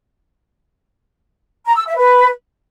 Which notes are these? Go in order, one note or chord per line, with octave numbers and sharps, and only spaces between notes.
A#5
E6
E5
B4